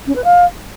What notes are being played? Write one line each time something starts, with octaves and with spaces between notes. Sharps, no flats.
C#4
B4
F5